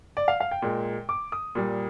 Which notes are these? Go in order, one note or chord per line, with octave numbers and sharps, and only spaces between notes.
D5
F5
F5
G5
A#2 G#3
D6
D#6
A#2 G3